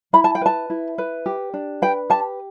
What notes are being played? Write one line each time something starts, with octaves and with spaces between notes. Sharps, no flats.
E4 B5
A5
G5
B4 A5
E4
B4
G4
D4
B4 G5
G4 A5